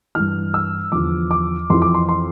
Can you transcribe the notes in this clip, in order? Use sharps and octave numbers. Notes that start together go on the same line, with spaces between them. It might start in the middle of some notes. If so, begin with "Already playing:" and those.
G2 E3 F6
E6
E2 D3 F3 D6
D6
F2 E3 C6
D6
C6
C6